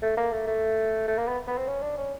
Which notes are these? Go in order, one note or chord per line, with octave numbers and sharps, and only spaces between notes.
A3
A#3
A3
A3
A3
A#3
B3
B3
C4
C#4
D4
C#4